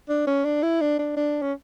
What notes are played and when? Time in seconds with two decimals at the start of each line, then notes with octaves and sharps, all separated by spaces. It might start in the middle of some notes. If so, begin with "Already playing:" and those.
0.09 D4
0.27 C#4
0.45 D4
0.63 E4
0.81 D4
0.99 D4
1.17 D4
1.42 C#4